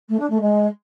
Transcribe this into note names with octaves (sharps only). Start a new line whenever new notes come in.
A3
D4
A3
G#3